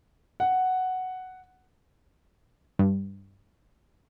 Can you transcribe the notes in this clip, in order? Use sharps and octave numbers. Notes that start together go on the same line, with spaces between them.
F#5
G2